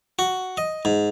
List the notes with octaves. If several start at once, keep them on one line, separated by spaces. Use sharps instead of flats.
F#4
D#5
G#2